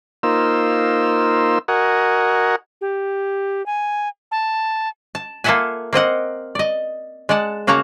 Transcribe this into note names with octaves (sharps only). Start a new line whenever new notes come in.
A#3 D#4 F4 C5 E6
F#4 A#4 D#5 F#5 G#5
G4
G#5
A5
A5
A#3 F4 A4 E5 F#5 G#5
A#3 C4 D#5 F#5
D5 D#5
G#3 D5 F#5 A5
C#3 A#3 F#4 C#5 A5 A#5